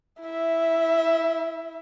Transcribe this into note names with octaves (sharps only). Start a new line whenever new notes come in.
E4 E5